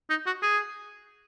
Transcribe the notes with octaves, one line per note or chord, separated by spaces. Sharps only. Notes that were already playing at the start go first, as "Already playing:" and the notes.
D#4
F#4
G#4